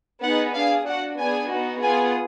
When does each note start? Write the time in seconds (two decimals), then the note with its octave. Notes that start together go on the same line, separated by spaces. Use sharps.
0.23 B3 D#4 G#4 F#5
0.55 D4 G#4 F5
0.86 D4 F#4 F#5
1.18 B3 D4 G#4 G#5
1.51 B3 D#4 F#4
1.82 B3 F4 G#4 G#5